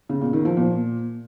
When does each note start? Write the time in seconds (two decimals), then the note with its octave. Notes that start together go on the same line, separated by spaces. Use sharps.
0.09 C#3
0.21 A#2
0.33 D#3
0.45 F3
0.57 A#2